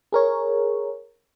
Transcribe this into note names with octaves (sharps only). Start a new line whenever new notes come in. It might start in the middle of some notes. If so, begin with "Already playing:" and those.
G#4 A#4 C#5